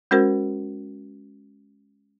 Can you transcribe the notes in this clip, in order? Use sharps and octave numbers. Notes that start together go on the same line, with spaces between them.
G#3 C#4 F#4 A#4 C5